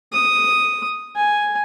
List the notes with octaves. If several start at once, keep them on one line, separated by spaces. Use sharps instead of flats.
D#6
G#5